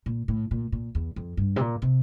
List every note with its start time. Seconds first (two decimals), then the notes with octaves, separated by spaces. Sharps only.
0.06 A#2
0.28 A2
0.51 A#2
0.72 A#2
0.95 E2
1.16 F2
1.37 G2
1.56 C3
1.60 A#2
1.82 C3